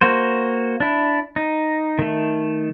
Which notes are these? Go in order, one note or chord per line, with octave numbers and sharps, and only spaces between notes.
A#3 F#4 C5
D4 E4
D#4
D#3 A3